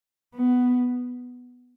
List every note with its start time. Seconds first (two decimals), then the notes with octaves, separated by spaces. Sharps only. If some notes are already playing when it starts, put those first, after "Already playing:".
0.35 B3